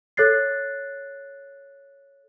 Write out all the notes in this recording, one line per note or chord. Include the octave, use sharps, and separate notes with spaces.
A4 C#5 F#6 A6 C7